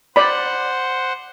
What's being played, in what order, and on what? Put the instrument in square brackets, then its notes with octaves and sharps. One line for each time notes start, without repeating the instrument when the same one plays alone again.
[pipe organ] C5 F#5 [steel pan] D5 B5